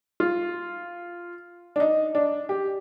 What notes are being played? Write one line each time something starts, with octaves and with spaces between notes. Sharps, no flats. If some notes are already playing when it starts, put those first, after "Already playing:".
F4
D4
D#4
D4
G4